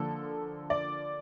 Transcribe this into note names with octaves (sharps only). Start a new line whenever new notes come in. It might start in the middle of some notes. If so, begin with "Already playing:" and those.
Already playing: D3 F3 A#3 A4
D5